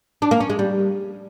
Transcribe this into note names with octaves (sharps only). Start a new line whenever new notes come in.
D4
A#3
C#4
G#3
G3